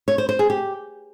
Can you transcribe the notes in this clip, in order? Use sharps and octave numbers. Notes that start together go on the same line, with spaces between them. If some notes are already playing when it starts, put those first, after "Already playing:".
C#5
C5
C5
G#4
G4